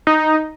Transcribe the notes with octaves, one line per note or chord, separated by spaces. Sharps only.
D#4